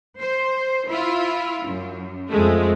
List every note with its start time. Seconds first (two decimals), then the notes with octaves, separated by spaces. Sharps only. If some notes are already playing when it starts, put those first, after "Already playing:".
0.20 C5
0.88 E4 F4
1.67 F#2
2.29 F2 G#3 A3